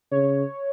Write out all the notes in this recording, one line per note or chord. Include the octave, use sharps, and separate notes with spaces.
C#3 C#5